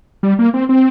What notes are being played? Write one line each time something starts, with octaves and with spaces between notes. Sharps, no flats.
G3
A#3
C4
C4